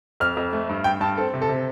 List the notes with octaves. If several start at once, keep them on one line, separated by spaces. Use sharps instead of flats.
F2 F6
F2
A3
G2
G2 G5
G2 A5
C4 A4
C3
A4
C3